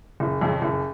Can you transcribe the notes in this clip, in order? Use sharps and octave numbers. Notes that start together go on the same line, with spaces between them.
F#1
F2 C#3
F#1